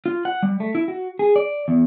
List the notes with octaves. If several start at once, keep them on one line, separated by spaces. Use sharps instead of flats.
F4
F#5
G3
A3
E4
F#4
G#4
D5
E2